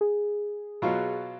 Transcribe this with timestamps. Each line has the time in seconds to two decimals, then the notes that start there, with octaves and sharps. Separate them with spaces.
0.01 G#4
0.82 B2 F#3 F4